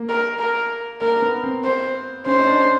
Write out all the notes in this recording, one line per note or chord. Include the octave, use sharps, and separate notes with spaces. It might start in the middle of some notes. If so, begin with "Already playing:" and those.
Already playing: A#3
A#4
A#4
A#3 A#4
B3
C4
C5
C#4 C5
D#4
D4